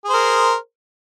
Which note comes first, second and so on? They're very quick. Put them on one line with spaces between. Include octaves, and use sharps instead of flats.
G#4 C5 A#4